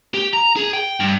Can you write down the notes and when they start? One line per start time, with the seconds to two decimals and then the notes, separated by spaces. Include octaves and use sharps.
0.14 G4
0.33 A#5
0.57 G#4
0.73 G5
1.00 G2